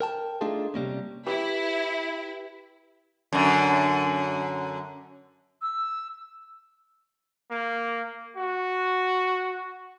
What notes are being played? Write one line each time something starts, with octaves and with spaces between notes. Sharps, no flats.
A#4 G5 A5
A3 D4 D#4 F4 G#4 A4
C3 G3 A#3 C#4
E4 G4 B4 E6
F#2 D3
E6
A#3
F#4